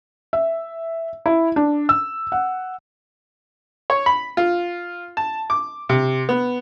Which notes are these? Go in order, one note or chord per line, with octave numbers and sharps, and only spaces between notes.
E5
E4
D4
E6
F#5
C#5
B5
F4
A5
D6
C3
B3